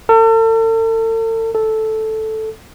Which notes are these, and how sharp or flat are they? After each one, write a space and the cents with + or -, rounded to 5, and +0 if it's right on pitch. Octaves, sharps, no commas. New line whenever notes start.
A4 +40
A4 -5